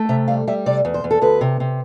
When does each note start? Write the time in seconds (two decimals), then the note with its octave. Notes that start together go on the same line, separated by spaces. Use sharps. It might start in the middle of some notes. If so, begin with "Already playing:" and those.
Already playing: A3
0.09 C3 E5
0.28 G3 F5
0.47 G3 E5
0.66 C3 D5
0.85 E2
0.94 C5
1.04 E2
1.11 A4
1.22 D2 B4
1.41 C3
1.60 C3